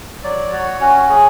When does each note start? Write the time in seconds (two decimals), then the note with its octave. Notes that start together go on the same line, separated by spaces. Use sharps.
0.24 F#3 D5
0.52 F#4 C#5
0.81 C#4 F#4
1.09 F#3 G#4